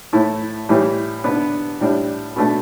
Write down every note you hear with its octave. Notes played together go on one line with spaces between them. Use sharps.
A2 A3 E4
A2 E3 G3
D3 B3 D4
A2 G3 D4
B2 A3 D4